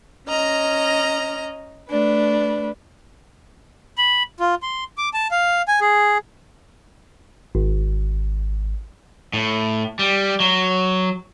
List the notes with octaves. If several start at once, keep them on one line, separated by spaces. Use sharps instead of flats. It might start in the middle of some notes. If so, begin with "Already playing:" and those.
C#4 D#5 A#5 F6
A3 D4 B4
B5
F4
C6
D6
A5
F5
G#5
G#4
G#1
A2
G3
F#3